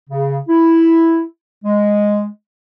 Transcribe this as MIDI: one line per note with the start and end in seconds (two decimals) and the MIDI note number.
0.09 0.37 49
0.48 1.22 64
1.64 2.28 56